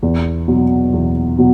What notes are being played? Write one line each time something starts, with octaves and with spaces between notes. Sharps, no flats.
E2
B2 F#3
E2
B2 F#3